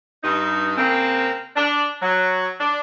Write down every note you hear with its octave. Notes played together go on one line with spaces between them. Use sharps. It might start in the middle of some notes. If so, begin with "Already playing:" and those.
G2 D#4
C#3 A#3 C4
D4
F#3
D4